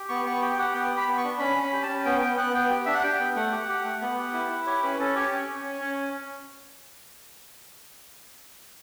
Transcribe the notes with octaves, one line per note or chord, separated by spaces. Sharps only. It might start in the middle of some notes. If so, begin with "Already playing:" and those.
Already playing: G4
B3 C#6
B3 C#6
G4 G5
G5
G4 F#5
B3 G5
G4
B5
B3
C#6
D4
C#4 B5
C#4
B5
G4
A5
C#4
B3 G5
B3 G5
B3 F#5
B3 G5
G4
D4 E5
F#5
G4 G5
B3
A3 F#5
G4
G4 F#5
A3
B3 F#5
G4
E4
E4
G4 C#5
C#4 B4
C#4 A4
G4 C#5
C#4
C#4
C#4
C#4